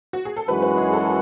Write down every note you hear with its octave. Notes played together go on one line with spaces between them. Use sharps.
F#4
G#4
A4
F#2 E3 G#3 D#4 F#4 B4
B4
G#4
A4